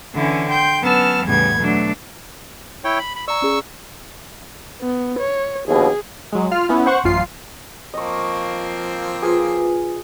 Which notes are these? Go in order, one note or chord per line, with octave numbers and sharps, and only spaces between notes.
D3 E3 C#4 E4
G5 C6 G6
F#3 B3 C#4 A5 E6 F6
E2 A2 C#3 G3 B3 G#6
B2 F#3 A3 D4
E4 C#5 G5
B5
B5
D5 A#5 C#6 E6
C#4 G#4
B3
C#5
A#1 D#2 B2 G#4
F#3 G#3
F4 F6
B3 C#4 E4
C5 F#5 C#6
A1 F#2 F4 C7
F3 A#3 C4 D#5 C#6
F4 G#4 B4